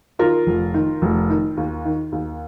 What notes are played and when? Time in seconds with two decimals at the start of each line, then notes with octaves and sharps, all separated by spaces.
0.19 D#3 F4 A#4
0.47 F1
0.74 D#3
1.02 F1
1.30 D#3
1.57 D#2
1.85 D#3
2.12 D#2